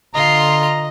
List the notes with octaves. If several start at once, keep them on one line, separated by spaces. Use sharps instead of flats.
D3 F4 D#5 A#5 C6